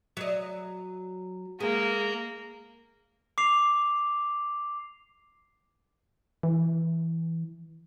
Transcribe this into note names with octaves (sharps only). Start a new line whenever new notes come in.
F#3 D#5
G#3 A#3
D6 C7 F7
E3